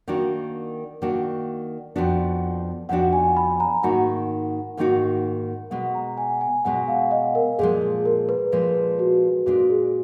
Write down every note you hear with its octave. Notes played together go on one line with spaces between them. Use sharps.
D#3 A#3 D4 F#4
D#3 A#3 D4 F#4
F2 F3 B3 D4 F#4
F2 F3 B3 D4 F#4 F#5
G#5
B5
A#5
G#2 D#3 A#3 D#4 F#4 F#5
G#2 D#3 A#3 D#4 F#4
B2 G#3 B3 F#5
A#5
G#5
G#5
B2 G#3 B3 F#5
F5
D#5
A#4
A#2 F3 G#3 G#4
G#4
A#4
B4
A#2 F3 G#3 B4
F#4
A#2 G#3 D4 F#4
G#4